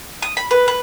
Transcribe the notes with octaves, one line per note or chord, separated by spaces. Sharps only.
D#6
B5
B4
B4